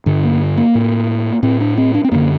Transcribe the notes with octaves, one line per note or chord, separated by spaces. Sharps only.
G2 D3
A#3
A#3
A2
A2 C4
D4
C4
D4
C4
F#2 D3 A#3